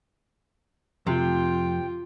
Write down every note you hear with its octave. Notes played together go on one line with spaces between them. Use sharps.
F2 C3 A3 F4 G5